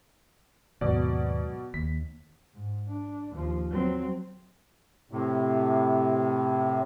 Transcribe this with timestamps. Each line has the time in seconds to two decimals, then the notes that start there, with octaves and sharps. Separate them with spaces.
0.81 D#2 G#2 B2 F#3 D5
1.74 D#2 B6
2.54 G#2
2.88 D4
3.33 D#2 F3
3.70 F#3 C4
5.11 A2 C3